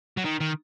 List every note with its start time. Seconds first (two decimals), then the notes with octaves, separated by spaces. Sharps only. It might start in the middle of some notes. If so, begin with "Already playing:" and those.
0.18 F#3
0.25 D#3
0.41 D#3